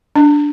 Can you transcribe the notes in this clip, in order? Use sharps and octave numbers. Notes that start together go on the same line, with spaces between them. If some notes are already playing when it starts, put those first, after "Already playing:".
D4